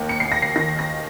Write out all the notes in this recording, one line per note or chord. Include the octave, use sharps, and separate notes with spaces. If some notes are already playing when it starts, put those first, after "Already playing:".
Already playing: D#2 A#3
C#7
D#2 C7
A#6
C7
D#3 A#6
A#6